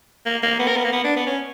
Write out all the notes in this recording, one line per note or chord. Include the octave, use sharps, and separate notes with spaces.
A#3
A#3
B3
A#4
B3
A#3
B3
D4
B3
C#4